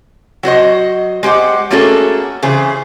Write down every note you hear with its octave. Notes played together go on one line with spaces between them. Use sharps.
F#3 F#4 C5 D#5
G#3 G4 C5 F#5
A3 A#3 C#4 F#4 G#4 A4
C#3 E3 G#4 C5